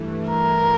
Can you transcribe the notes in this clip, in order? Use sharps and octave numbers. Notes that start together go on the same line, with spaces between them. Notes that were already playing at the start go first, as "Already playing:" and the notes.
Already playing: G2 E3 A3
A#4